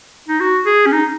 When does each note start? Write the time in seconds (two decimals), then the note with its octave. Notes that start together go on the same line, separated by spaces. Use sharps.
0.28 D#4
0.40 F#4
0.66 G#4
0.86 C#4
0.92 D#4